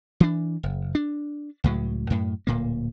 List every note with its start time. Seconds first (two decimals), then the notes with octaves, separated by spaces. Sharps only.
0.20 E3 D4
0.63 F#1
0.95 D4
1.64 C#2 A2 F#3
2.10 F#2 A2
2.47 D1 A#2 A#3